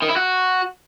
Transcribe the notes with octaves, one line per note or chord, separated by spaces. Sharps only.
D#3
E4
F#4